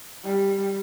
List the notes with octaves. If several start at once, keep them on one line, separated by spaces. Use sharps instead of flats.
G3